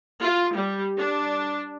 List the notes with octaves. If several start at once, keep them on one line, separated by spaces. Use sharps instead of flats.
F4
G3
D4